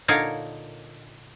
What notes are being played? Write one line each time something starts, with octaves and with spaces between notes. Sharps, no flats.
A#2 D3 D#4 A#4 C#5 F5